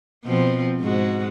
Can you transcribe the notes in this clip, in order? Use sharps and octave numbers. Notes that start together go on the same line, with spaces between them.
B2 F3 C4
G#2 G#3 F#4